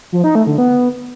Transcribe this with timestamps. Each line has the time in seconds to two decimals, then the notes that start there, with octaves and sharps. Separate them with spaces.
0.12 F3
0.24 D#4
0.35 A3
0.47 D3
0.58 B3